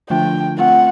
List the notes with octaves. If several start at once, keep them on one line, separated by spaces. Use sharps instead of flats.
D3 F3 A3 D4 F4 G5
A3 C4 F4 F#5